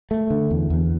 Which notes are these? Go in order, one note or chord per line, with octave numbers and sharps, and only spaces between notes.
A3
D3
E2
E2